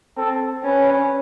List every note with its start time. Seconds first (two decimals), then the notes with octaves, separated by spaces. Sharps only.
0.17 C4 A4
0.64 C#4 B4